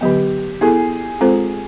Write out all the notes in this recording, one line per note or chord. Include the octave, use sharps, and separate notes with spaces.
D3 F#3 B3 G4
B3 E4 G#4 A4
G#3 C4 F4 A4 C5